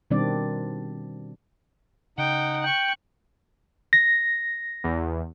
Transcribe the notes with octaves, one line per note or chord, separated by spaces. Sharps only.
B2 D#3 G3 C4 D4 D5
C#3 D#4 F#5 G5
G5 C#6 F#6
A#6
E2